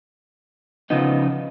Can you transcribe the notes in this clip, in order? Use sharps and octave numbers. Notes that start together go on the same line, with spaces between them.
C#3 F3 B3 D#4